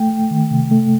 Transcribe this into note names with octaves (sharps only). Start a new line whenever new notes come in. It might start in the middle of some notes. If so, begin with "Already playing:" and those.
Already playing: A3 G5
A3
D#3
C3
A3